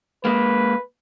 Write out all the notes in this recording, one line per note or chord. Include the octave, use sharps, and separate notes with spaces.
G#3 A#3 B4